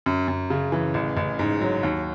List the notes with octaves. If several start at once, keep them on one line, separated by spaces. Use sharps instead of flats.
F#2
F#2
C#3
E3
A1
A1
G#2
F#3
D#2